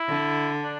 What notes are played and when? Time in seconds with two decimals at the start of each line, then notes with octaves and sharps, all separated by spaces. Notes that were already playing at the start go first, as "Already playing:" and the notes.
Already playing: E4
0.08 D3
0.62 D4